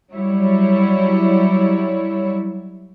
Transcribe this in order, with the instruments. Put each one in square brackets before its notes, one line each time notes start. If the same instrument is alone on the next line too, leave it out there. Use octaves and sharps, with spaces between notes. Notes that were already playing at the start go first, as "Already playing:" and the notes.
[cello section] F#3 G3 E4 C#5